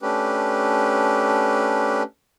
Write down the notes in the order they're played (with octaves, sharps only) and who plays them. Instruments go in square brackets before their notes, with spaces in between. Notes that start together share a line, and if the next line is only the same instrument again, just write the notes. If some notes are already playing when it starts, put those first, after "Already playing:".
[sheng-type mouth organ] A3 C#4 D4 G4 B4